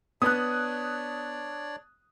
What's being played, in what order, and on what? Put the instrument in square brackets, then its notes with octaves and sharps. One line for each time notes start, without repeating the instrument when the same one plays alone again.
[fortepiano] B3 [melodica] D4 C#5 D5 [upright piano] D#6 F#6